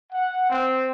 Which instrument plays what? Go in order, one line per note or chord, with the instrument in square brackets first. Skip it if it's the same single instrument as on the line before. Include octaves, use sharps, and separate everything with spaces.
[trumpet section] F#5
C4